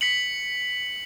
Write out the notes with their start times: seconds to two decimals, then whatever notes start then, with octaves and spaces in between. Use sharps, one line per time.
0.01 B6 C#7 F#7